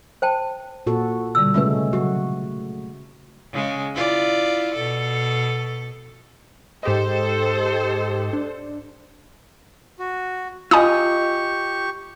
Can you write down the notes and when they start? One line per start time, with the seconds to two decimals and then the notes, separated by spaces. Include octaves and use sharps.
0.22 C5 G5 A5
0.87 A#2 F#4 A4
1.35 B2 D3 G3 E6
1.54 C#3 G#3 A3 C#4 F4 B4
1.93 C#3 F#3 A3 F#4 G4
3.52 C#3 G#3
3.94 E4 F4 D5
4.75 B2 A4
6.83 G#2 G4 A4 C5 D#5
8.33 D4
9.99 F#4
10.71 F4 G4 D#5 G#5 B5 C#6 D#6